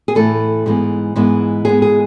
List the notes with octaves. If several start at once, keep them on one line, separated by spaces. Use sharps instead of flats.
G#4
A2 E3 A3 A4
G#2 E3 G#3 B3
G#2 E3 G#3 B3
G#2 E3 G#3 B3 G#4
G#4